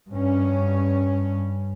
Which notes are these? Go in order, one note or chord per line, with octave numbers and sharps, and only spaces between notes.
G2 C#4